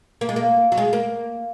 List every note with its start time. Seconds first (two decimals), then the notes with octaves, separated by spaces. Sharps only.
0.21 A#3
0.29 G#3
0.36 A#3
0.72 F#3
0.77 G#3
0.93 A#3